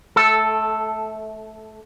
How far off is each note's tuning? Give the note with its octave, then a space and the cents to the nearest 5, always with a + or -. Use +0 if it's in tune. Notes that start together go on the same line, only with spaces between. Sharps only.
A3 -20 A4 +0